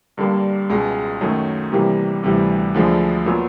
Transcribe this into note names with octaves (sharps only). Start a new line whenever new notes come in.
G2 D3 G3 A#3
C#2 B2 G#3
F#2 D#3 F#3 A3
C3 E3 G3 A#3
D2 C3 E3 G3
D2 D3 F3 G#3
A#2 F#3 B3